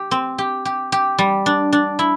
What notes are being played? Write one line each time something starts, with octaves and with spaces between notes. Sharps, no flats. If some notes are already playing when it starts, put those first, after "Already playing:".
Already playing: G4
C4
G4
G4
G4
G3
D4
D4
E4